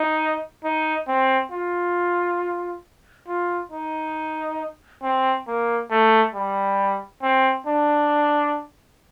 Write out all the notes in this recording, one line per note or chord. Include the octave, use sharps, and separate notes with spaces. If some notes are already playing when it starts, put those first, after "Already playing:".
Already playing: D#4
D#4
C4
F4
F4
D#4
C4
A#3
A3
G3
C4
D4